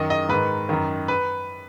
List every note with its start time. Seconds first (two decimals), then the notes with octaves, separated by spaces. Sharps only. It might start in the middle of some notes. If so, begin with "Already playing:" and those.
Already playing: F#2 D#3 D#5
0.10 D#5
0.29 G#2 D#3 B4
0.69 F#2 D#3
1.08 B4